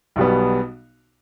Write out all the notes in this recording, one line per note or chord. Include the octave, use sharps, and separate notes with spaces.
B1 B2 G3 B3